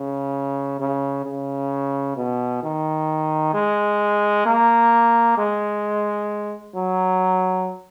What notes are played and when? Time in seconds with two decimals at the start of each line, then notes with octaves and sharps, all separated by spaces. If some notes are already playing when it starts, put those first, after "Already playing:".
Already playing: C#3
0.79 C#3
1.25 C#3
2.17 B2
2.63 D#3
3.54 G#3
4.46 A#3
5.38 G#3
6.75 F#3